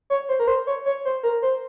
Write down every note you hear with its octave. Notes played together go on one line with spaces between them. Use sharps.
C#5
C5
A#4
C5
C#5
C#5
C5
A#4
C5